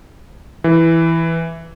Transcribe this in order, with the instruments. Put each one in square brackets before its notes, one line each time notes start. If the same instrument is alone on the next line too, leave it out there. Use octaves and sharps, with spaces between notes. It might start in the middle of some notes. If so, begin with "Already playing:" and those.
[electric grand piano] E3